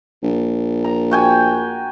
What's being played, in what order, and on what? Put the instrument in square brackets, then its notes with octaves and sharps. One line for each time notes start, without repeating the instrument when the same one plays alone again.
[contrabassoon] A#1
[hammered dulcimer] A#5
F#4 G5 G#5